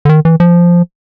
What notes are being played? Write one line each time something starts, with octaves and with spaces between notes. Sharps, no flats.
D3
D#3
E3
F3